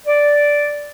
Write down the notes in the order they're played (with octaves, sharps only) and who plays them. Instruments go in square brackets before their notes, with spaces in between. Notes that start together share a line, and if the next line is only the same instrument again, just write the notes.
[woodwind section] D5